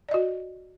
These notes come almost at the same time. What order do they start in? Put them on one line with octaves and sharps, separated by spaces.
D5 D#5 F#4